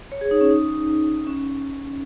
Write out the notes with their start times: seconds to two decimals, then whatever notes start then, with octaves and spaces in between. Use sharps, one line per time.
0.12 C#5
0.21 G#4
0.31 D#4
0.41 C#4
0.51 D#4
1.27 C#4